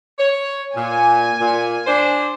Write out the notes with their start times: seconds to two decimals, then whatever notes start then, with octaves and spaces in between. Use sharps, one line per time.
0.18 C#5
0.76 A#2 G#5
1.40 A#2
1.87 D4 C5